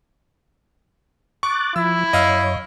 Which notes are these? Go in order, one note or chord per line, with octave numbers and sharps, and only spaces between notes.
C#6 D6 F#6 A6
F3 E4 E6
F#2 C#5 D#5 F5 E6